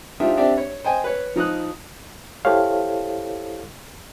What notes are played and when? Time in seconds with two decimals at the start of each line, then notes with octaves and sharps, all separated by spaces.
0.20 D4 D#4 F4 G4 C5 E5
0.37 C4 D4 G4 D5 E5
0.57 C#5
0.84 C5 D#5 G5 G#5
1.04 B4 C#5
1.36 F3 D#4 D#6 F#6
2.45 E4 G4 A4 C5 C#5 F5